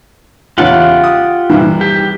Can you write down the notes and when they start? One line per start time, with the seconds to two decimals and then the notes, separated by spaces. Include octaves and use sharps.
0.58 E2 C#3 C#4 F4 G4 F#5
1.04 D#6
1.50 C2 D#3 E3
1.81 G4